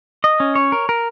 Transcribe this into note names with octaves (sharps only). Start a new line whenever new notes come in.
D#5
C#4
C#5
A#4
A#4